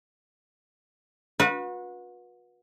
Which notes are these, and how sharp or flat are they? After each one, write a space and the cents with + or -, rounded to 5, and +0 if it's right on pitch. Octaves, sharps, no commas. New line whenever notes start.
F#4 -35 B4 -25